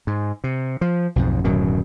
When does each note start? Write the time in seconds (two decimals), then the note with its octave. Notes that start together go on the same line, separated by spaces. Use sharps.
0.07 G#2
0.44 C3
0.81 F3
1.16 B1 F2 G#2
1.44 D1 F#2 B2 D#3